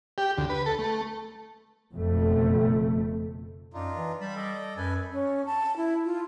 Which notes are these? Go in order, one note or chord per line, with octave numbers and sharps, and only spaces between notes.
G4
D2
B4
A4
A3
F#1 F2 B2 A3
F#2 D4 D#4 F4
E3
G3 A5 B5
A4 D5 D#5
F#2 A4 B4 G#5
C#4
A5
E4
F4